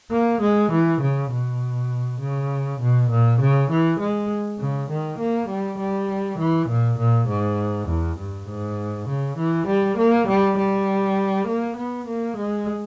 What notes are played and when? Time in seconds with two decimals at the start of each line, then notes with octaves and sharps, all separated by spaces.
0.11 A#3
0.41 G#3
0.72 E3
1.01 C#3
1.31 B2
2.21 C#3
2.80 B2
3.10 A#2
3.40 C#3
3.70 E3
4.00 G#3
4.59 C#3
4.90 D#3
5.19 A#3
5.49 G3
5.79 G3
6.38 E3
6.69 A#2
6.98 A#2
7.28 G#2
7.88 E2
8.19 G2
8.48 G#2
9.08 C#3
9.37 E3
9.67 G3
9.98 A#3
10.27 G3
10.58 G3
11.47 A#3
11.77 B3
12.07 A#3
12.37 G#3